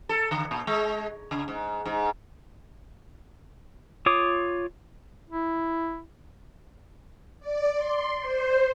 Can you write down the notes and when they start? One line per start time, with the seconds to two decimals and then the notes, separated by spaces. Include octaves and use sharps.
0.09 A4
0.31 D3
0.51 A#2
0.67 G#3
1.31 C#3
1.48 G#2
1.86 G#2
4.06 F4 C#5 D6 D#6
5.30 E4
7.40 D5
7.76 C6
8.20 C5